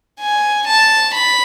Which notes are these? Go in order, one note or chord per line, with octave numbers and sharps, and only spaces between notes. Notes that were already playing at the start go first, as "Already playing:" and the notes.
G#5
A5
B5